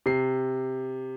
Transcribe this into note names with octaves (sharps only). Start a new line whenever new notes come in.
C3 C7